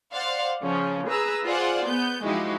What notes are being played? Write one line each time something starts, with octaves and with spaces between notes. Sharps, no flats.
C5 D5 F5 F#5
C#3 F3 C#4
G#4 B4 A#5 E6
F4 G#4 C5 D5 F#5
B3 G6
F3 G#3 D#4 E4 F#4 G4